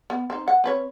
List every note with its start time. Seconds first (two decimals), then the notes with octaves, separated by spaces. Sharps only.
0.10 B3
0.30 C4 D#4
0.48 F#5
0.64 C4 B4 C#5